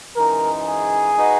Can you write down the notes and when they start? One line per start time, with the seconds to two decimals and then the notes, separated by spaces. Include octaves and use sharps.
0.16 F#2 E3 G#3 D#4 A#4
0.66 G#4
1.17 G#3 D#4 F#4 B4 D#5